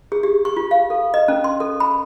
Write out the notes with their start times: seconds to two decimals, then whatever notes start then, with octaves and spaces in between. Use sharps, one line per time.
0.12 G#4
0.23 G4
0.45 C#6
0.56 F4
0.71 F5
0.90 A4
1.14 D#5
1.28 C#4
1.44 C6
1.60 A4
1.80 B5